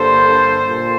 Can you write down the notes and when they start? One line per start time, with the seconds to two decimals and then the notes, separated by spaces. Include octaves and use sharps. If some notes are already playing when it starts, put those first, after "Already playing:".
Already playing: G2 D3 G3 A#3 A4 C5
0.68 A#2